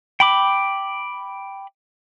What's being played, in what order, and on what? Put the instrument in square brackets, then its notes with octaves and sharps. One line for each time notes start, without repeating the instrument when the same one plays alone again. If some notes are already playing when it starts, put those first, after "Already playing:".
[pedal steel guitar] G5 B5 D6